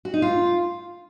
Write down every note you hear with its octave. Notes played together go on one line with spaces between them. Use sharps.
F#4
D#4
F4